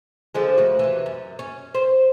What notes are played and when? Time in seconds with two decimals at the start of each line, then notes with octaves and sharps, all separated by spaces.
0.35 D3 F3 G#3
0.58 D2 F#4
0.79 C3 E3
1.06 F#2
1.39 C#4
1.74 C5